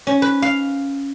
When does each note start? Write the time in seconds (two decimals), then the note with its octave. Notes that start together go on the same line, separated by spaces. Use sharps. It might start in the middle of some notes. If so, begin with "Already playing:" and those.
0.07 C#4
0.22 B4
0.42 F5